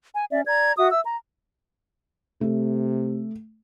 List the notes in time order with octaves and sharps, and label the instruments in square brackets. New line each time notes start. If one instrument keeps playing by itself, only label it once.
[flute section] G#5
C#4 D5 E5
D5 A#5 G#6
F#4 E5 D#6
E5 E6
A#5
[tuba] C3 [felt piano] A3